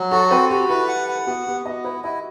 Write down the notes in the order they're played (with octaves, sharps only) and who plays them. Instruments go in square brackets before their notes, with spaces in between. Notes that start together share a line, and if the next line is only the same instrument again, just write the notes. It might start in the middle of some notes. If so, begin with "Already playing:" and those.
Already playing: [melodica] F#3
[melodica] F#4 [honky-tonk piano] A4
[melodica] C4 [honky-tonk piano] B4
[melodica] F#4 [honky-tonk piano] G4
[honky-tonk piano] E4 [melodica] B4
[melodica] F#5
F#5
[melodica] B3 [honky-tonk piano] F#4
[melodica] B3 [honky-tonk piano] G4
[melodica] B3 [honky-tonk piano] D#5
[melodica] E4 [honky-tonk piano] B4
[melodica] E4 [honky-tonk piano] D#5